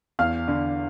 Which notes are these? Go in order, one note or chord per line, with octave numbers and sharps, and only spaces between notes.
E2 F5 F6
D3